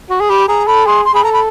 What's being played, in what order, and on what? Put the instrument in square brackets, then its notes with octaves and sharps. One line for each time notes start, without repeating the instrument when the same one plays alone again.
[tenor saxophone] F#4
G#4
[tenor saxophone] G4 [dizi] B5
[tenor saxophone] G#4 [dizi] A#5
[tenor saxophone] A4 [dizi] B5
[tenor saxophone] G#4 [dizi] C6
[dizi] C6
[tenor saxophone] G#4 [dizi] B5
[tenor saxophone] A4 [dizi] A#5
[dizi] B5